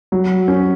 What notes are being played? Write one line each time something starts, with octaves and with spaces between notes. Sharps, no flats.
F#3
C#4